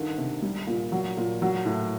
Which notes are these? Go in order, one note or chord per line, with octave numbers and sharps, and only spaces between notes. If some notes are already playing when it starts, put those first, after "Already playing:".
Already playing: G2 D3 D#3
C3
G3
A#2
F#3
A#2
F#3
A2